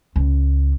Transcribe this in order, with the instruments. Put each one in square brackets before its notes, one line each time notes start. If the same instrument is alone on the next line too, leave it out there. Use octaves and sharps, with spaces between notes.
[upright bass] C#2